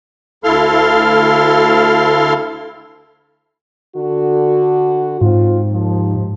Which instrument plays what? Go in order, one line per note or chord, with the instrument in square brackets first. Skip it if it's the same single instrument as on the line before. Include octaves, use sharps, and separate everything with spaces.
[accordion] D2 E4 A4 F5 C6 F6
[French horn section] D3 F#4
[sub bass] G#2 [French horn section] C4 F4
[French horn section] D#2 F3